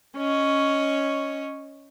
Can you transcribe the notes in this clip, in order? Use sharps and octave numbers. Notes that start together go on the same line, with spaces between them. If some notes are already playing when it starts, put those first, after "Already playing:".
C#4 C#5 D#5